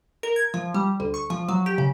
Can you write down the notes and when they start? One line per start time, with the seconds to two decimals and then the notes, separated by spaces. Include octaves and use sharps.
0.23 A#4
0.36 G#6
0.54 F3
0.74 G3
1.00 D2
1.14 C#6
1.30 F3
1.49 F#3
1.66 G4
1.78 C#3